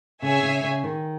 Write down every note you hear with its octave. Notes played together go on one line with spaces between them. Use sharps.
C#3 G#4 C#5 E5 G#5
C#3
C#3
D#3